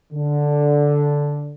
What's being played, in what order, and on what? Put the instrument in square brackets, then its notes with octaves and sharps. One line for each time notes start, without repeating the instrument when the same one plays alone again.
[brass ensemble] D3